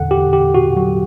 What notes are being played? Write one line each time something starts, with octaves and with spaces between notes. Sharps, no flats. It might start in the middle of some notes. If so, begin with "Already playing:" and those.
Already playing: E2 D3 A4 F#5
G4
E2 G4
F#4
F#3 F#4